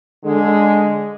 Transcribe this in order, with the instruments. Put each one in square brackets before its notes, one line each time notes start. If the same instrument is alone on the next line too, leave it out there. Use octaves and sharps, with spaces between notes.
[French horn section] D3 G#3